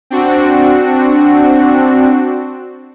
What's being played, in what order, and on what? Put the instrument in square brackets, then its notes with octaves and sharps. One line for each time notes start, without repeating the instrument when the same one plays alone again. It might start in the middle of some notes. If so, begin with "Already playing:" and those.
[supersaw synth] C4 D4 F#4